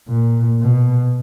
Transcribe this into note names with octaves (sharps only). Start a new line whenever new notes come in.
A#2
B2